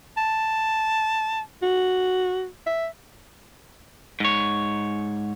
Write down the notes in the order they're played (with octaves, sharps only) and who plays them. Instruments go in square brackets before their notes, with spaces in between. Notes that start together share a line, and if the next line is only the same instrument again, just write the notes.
[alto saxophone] A5
F#4
E5
[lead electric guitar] G#2 C#5